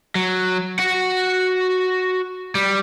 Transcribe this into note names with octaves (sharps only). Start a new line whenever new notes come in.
F#3
F#4 F#5
G3